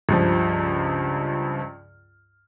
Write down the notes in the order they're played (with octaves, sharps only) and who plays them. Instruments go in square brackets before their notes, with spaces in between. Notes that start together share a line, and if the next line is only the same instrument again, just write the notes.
[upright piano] C#2 G2 F3